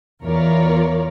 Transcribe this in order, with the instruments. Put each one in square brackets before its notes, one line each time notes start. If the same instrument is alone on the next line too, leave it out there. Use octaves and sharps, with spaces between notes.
[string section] E2 E3 F4 A#4 C#5 D5